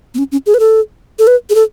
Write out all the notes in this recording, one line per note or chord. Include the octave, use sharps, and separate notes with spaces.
B3
C#4
C#4
G#4
B4
A4
A4
B4
G#4
A4